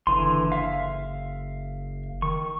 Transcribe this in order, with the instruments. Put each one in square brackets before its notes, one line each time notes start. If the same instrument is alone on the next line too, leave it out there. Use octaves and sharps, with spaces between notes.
[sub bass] F#1 [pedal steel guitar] D3 E3 C6
[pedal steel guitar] E5 F5
[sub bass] D#3 [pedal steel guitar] C#6